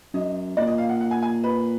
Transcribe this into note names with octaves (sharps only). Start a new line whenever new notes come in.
F#2 D#5
A#2 D5
D#5
F5
F#5
F#5
G#5
G#5
B4